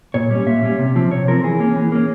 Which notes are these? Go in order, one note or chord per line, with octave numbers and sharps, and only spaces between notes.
A#2 C#5
G3 C#4
A#2 E5
G3 C#4
C3
F3 C4
C3 C#5
F3 C4 A#4
E3 G#4
A#3 C#4
E3
A#3 C#4